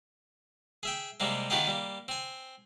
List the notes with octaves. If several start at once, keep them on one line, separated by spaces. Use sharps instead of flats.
G#4 E5 G5
C3 G3 G#3 A#3 C4
D#3 B3 D#4 F4 G4 G#4
G3 A#3
C4 G#5